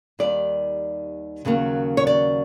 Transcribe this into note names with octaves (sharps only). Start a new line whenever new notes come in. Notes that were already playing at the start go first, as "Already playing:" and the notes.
D#2 D#3 G3 D5
D#2 C#3 F#3 A#3
C#5
D5